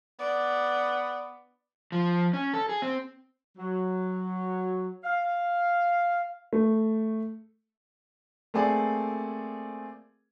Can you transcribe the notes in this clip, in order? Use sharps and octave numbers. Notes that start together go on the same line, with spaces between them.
B3 D5
F3
C#4
A4
G#4
C4
F#3
F5
A3
A3 A#3 C4 G#4 D5